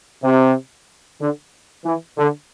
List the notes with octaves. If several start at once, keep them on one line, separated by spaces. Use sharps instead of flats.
C3
D3
E3
D3